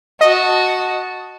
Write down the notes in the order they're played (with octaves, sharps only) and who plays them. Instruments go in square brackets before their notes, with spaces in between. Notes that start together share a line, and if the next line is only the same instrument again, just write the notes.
[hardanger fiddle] F#4 A5 [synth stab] D#5